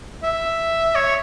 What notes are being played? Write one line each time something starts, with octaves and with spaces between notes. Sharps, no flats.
E5
C#5